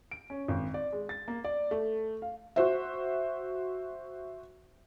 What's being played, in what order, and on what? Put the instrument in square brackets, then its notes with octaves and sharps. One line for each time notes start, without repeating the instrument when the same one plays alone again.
[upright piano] D7
C#4
G#1
D5
G#3
A6
A#3
D5
A3
F5
[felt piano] F#4 C5 E5